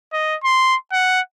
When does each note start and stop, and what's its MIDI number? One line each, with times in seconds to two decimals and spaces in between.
0.13 0.35 75
0.44 0.76 84
0.93 1.20 78